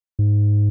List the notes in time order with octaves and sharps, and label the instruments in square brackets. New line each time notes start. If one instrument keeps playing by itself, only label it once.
[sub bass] G#2